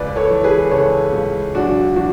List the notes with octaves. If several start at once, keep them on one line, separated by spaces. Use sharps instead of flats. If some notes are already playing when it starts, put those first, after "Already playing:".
Already playing: C#2 B4 D5
A4 C#5
E3
G#4 B4
C#3 A4 C#5
C#2
B1 D4 F#4
E3 D4 F#4